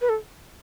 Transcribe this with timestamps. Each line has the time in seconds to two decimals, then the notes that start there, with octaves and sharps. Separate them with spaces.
0.01 B4
0.09 A4